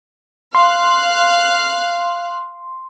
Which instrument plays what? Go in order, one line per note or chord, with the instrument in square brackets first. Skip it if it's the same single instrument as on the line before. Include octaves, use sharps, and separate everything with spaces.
[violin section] F5 F#6 [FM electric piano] C6